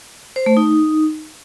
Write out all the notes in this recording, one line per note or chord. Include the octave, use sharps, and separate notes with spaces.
C5
A3
D#4